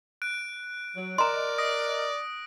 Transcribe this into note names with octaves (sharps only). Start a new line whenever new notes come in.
F#6 D7
F#3
A#4 D5 D#5 A#5 C6
D#6 A#6 D7